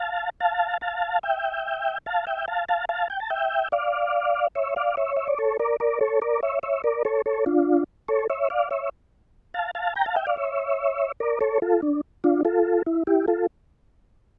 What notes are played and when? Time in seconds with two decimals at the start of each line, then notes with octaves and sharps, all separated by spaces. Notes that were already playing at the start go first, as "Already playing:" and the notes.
Already playing: F5 A5
0.40 F5 A5
0.81 F5 A5
1.23 E5 G5
2.06 F5 A5
2.27 E5 G5
2.48 F5 A5
2.69 F5 A5
2.89 F5 A5
3.10 G5
3.20 A5
3.30 E5 G5
3.72 D5 F5
4.55 C#5 E5
4.76 D5 F5
4.97 C#5 E5
5.16 E5
5.28 D5
5.38 A4 C#5
5.59 A#4 D5
5.80 A#4 D5
6.01 A4 C#5
6.22 A#4 D5
6.43 C#5 E5
6.63 C#5 E5
6.84 A#4 D5
7.05 A4 C#5
7.26 A4 C#5
7.46 D4 F4
8.08 A4 C#5
8.30 C#5 E5
8.50 D5 F5
8.71 C#5 E5
9.54 F5 A5
9.75 F5 A5
9.95 G5 A#5
10.06 F5 A5
10.16 E5 G5
10.27 D5 F5
10.37 C#5 E5
11.20 A#4 D5
11.41 A4 C#5
11.62 F4 A4
11.82 D4
12.24 D4 F4
12.45 F4 A4
12.86 E4
13.07 E4 G4
13.28 F4 A4